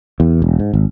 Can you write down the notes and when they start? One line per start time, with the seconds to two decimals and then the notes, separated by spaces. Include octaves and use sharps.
0.20 E2
0.42 E1
0.59 G#2
0.73 G#1